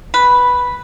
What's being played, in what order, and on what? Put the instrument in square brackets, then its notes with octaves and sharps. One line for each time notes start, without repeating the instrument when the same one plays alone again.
[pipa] B4